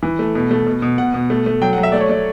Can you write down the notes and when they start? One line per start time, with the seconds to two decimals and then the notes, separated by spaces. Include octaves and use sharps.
0.03 E3
0.19 A3
0.35 B2
0.51 A3
0.67 B2
0.82 B2
0.98 B2 F#5
1.14 B2
1.30 A3
1.46 A3
1.61 F#3 G5
1.73 F#5
1.78 F#3
1.83 E5
1.92 A3 D5
2.00 C#5
2.09 A3 D5